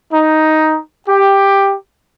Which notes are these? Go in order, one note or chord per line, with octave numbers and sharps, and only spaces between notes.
D#4
G4